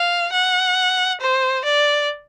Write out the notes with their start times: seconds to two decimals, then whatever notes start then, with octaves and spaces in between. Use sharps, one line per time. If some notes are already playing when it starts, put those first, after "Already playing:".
Already playing: F5
0.33 F#5
1.21 C5
1.65 D5